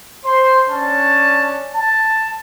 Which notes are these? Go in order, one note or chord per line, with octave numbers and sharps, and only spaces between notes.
C5 C6
C#4 D4 A5
A5